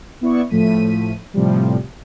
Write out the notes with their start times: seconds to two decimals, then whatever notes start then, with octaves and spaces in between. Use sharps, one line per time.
0.21 B3 E4 D5 C#6
0.50 A2 F3 A3 B6 D#7
1.34 A2 C3 F3 G3